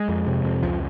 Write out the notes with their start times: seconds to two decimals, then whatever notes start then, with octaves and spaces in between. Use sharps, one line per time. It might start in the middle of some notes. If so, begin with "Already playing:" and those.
Already playing: G#3
0.09 F2
0.27 C3
0.44 F2
0.63 C#2 F3